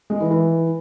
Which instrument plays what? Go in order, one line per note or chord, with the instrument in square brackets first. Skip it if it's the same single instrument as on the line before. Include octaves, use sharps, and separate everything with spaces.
[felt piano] G#3
E3
E3